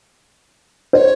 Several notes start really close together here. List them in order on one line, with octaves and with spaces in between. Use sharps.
C5 D#5 C#5